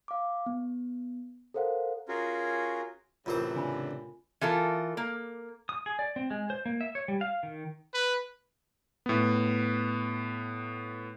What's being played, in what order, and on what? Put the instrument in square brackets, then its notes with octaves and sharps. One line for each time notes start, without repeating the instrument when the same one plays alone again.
[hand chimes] F5 D6
B3
A4 A#4 C5 F5 F#5
[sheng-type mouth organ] C#4 F4 F#4 G#4 A#4
[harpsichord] F#2 E3 C5 [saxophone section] A2 C3 [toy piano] F4 A#4
[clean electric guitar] C#3 D4 [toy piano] G#5 B5
[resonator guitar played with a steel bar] E3 F4 A4 A#4
A#3
[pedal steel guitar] D#6
G#4
D5
C4
G#3
C5
A#3
E5
C#5
G3
F5
D#3
[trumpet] B4
[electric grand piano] A2 B3